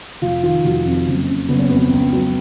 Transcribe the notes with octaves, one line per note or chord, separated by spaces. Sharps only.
F1 F4
D#3 F4
F1 F#4
F2 F#4
F#1
C#3
F#1 B3
C#4
F2 B3
C#2
F#3